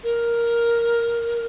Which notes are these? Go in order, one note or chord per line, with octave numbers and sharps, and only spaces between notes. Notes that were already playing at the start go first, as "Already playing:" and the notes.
A#4